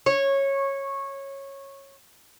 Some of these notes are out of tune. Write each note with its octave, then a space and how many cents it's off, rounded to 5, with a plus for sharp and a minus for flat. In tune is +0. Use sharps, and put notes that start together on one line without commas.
C#5 -15